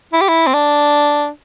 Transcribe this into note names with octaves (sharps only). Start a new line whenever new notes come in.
E4
G4
E4
C4
D4